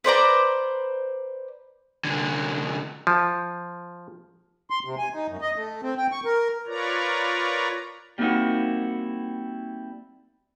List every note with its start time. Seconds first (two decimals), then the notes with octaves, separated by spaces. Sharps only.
0.04 B4 C5 D5 A#5
2.05 C2 D3
3.07 F3
4.70 C6
4.85 C3
4.98 G#5
5.14 D#4
5.28 F#2
5.41 D#5
5.56 A3
5.83 C4
5.98 G5
6.12 C#6
6.25 A#4
6.67 F4 A#4 B4 C#5 D5 A#5
8.18 G3 A#3 C4 D#4 E4 F#4